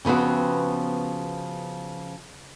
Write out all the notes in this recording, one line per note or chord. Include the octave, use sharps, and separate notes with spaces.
C#3 F3 B3 C4 F#4